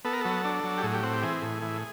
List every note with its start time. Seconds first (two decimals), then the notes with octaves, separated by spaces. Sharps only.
0.05 B3 A4
0.13 A#4
0.21 F#3 A4
0.45 D4
0.64 F#3
0.78 G4
0.83 A2 G#4
0.94 G4
1.03 C4 F#4
1.13 G4
1.23 E3 G#4
1.42 A2
1.62 E3